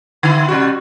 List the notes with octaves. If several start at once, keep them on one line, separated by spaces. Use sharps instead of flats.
D3 E4
C3 G3 F#4